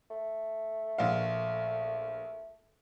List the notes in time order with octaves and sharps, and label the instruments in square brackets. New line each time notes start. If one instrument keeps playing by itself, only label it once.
[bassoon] A3
[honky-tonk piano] A#1 F5